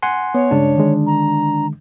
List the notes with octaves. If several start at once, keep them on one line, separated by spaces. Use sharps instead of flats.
F#5 G#5 C6
B3 C#5
G2 C#3 G#3 D4
D3 D#3 G#3
A#5